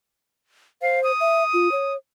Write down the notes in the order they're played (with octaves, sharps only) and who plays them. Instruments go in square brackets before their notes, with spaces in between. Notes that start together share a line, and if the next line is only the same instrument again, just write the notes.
[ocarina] C5 [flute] F5
[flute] D#6
[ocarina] E5
F4
C#5